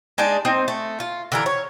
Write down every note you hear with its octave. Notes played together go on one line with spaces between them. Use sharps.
G#3 D4 D#4 D5
C4 D#4 C5
A3
F4
D3 E3 A#4
C#5